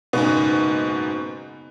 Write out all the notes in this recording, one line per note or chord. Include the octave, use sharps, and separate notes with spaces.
F#1 G#2 B2